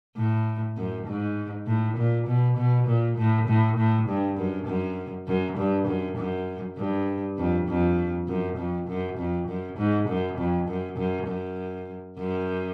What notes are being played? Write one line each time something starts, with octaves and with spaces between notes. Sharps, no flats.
A2
F#2
G#2
A2
A#2
B2
B2
A#2
A2
A2
A2
G2
F#2
F#2
F#2
G2
F#2
F#2
G2
F2
F2
F#2
F2
F#2
F2
F#2
G#2
F#2
F2
F#2
F#2
F#2
F#2